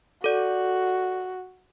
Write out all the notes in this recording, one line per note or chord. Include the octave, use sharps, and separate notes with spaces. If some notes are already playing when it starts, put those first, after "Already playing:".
F#4 A4 D5